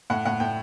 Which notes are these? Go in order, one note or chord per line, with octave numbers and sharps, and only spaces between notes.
A2 F#5
A2 F#5
A2 G5